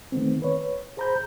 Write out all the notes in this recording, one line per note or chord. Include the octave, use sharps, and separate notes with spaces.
D#3 A3 B3 C4
B4 C#5
G#4 C5 A#5 B5 G6